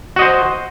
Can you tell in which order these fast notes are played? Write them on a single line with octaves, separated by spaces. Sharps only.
F#4 D#5 C5